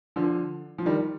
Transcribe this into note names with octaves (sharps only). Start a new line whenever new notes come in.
D3 F3
F3
D#3 G3